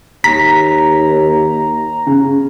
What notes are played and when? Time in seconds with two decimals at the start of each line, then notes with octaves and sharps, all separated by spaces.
0.24 D#2 A#5 B6
2.07 C#3